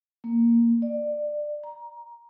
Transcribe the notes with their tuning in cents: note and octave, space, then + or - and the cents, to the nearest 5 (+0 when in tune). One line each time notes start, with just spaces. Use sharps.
A#3 +0
D5 +20
A#5 +15